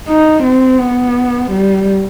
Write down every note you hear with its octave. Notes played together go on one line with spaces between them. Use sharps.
D#4
C4
B3
G3